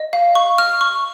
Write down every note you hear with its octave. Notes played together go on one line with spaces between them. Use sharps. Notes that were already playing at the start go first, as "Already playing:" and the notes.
Already playing: D#5
F5
C#6
F6
C#6